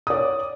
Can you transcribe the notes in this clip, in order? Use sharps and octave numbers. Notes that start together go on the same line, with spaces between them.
C#5 D5 D#6